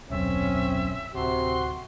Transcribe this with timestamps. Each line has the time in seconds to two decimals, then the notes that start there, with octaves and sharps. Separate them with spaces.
0.10 D#1 B1 F#2 C4 C#4 E5
1.15 D1 C3 F#4 C6